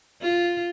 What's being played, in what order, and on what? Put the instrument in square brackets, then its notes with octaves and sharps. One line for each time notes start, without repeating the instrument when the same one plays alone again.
[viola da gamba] F4